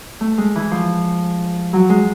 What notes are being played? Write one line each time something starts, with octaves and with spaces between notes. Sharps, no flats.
A3
G#3
E3
F3
F#3
G#3